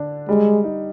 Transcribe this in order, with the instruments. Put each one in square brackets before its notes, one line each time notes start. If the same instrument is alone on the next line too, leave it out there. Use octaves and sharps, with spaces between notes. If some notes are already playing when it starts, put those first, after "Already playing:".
Already playing: [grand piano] D3 D4
[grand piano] G3 [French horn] G#3
[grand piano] D#4